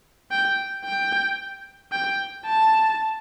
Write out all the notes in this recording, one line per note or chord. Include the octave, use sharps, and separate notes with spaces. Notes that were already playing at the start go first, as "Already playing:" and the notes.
G5
G5
G5
A5